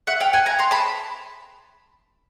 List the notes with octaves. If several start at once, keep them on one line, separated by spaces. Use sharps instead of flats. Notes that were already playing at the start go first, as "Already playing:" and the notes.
E5 F#5
F5 G5
F#5 G#5
G#5 A#5
A#5 C6
A5 B5